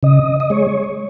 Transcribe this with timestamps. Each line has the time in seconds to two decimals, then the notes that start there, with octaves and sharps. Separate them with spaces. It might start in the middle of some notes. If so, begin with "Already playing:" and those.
0.03 C#3 D#5
0.40 D#5
0.50 G#3 C#5